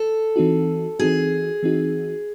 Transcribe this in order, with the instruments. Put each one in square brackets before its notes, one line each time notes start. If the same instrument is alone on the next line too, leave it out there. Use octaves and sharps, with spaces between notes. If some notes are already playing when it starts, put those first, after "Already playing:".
Already playing: [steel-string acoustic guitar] A4
[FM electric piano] E3 C4 D#4 F#4
[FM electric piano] E3 C4 D#4 F#4 [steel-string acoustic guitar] G#4
[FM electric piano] E3 C4 D#4 F#4